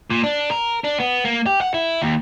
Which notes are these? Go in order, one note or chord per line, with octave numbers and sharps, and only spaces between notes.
A#2
D4
A#4
D4
B3
A#3
G4
F#5
E4
D#2